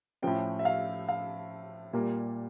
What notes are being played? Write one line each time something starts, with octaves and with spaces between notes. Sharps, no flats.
A2 F3 C#4 G5
E5
F5
F5
A#2 G3 A#3